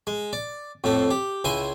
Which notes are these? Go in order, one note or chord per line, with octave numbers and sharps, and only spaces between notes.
G#3
D5
F2 A2 A3
G4
C#2 E4 G#5 C6